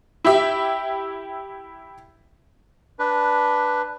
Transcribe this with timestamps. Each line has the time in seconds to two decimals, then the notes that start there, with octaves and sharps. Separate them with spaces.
0.25 E4 G4 E5
2.99 D4 B4